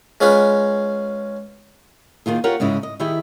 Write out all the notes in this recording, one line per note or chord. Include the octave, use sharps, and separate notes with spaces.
G#3 C#4 F4 G#4 B4
D#2 D#3 F4 G#4
F4 G4 A#4 C#5 F#5
G#2 C#3 G#3 E4
D#5
D#3 E4 G4 G#4